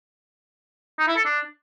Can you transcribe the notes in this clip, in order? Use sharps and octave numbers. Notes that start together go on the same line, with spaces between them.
D#4
E4
A4
D4